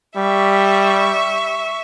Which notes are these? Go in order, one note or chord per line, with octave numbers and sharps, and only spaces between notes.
G3 E5 C#6